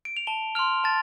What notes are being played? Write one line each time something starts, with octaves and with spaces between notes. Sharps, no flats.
D7
F7
A5 G7
C6 F6 F7
A5 A6